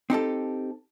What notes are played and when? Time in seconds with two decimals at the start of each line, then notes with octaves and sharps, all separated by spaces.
0.10 C4 D#4 G4 A4